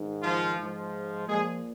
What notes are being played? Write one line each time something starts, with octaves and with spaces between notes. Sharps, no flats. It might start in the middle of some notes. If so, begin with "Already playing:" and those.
Already playing: G#2 D#3
F3 F4
G#2 F3
A#2 F3 G#3 G#4